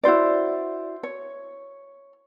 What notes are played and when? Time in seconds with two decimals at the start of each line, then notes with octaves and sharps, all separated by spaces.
0.04 E4 F#4 C5 D5
1.03 C#5